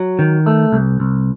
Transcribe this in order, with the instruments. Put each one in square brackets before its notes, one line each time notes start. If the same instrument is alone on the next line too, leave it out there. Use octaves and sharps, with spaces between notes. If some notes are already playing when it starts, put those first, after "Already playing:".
Already playing: [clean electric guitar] F#3
D#3
A3
C2
C2